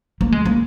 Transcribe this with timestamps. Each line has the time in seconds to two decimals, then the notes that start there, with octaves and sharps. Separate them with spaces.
0.21 A#3
0.32 G#3
0.45 A#3